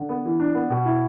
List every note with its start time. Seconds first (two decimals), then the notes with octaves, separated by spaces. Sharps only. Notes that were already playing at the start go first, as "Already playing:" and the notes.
Already playing: D3
0.09 B3
0.25 E3
0.40 D4
0.55 B3
0.70 B2
0.85 E4